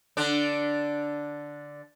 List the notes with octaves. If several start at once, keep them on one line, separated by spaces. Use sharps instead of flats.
D3 D4